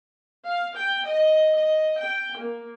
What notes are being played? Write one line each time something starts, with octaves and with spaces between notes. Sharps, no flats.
F5
G5
D#5
D#5
G5
A#3